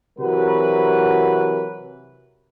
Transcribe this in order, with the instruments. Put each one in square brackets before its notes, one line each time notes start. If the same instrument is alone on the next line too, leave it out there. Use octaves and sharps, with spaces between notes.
[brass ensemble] C3 E3 F#3 F#4 A#4 B4